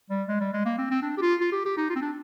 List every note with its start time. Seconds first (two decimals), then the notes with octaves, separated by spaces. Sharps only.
0.10 G3
0.28 G#3
0.40 G3
0.53 G#3
0.65 A#3
0.78 C4
0.91 C4
1.02 D4
1.17 G4
1.21 F4
1.41 F4
1.52 G4
1.65 G4
1.77 D#4
1.90 F4
1.96 C4
2.02 D4